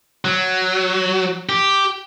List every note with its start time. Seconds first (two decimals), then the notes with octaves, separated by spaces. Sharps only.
0.25 F#3
1.49 G4